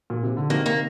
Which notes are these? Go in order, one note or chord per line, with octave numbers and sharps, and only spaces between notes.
A#2
C3
D3
C3 D#3 A#3
A#3